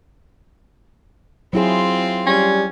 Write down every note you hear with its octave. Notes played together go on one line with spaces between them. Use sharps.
F#3 C4 E4 F4 G#4
G3 C#4